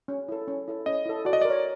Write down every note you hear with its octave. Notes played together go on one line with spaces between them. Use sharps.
C#4
E4 A4
C#4
E4 A4
C#4 D#5
E4 A4
F#4 D5
D#5
A#4 D5
C#5